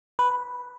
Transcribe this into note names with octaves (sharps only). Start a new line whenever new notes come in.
B4